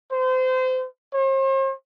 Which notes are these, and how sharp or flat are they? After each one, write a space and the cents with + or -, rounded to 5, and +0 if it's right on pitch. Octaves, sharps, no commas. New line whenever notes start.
C5 -30
C5 +45